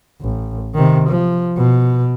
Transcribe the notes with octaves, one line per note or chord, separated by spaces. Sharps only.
A1
C3 D#3
F3
B2